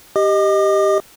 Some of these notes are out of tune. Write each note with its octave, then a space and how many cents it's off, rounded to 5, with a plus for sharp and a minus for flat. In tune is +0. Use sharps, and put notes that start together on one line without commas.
G4 +0 D#5 +0 D6 +45